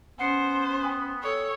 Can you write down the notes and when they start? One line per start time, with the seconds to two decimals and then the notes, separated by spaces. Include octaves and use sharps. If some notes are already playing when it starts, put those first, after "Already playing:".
0.19 B3 C#4 C5 F#5 C7 C#7
0.83 G5 G#5 D#6
1.23 A4 C#5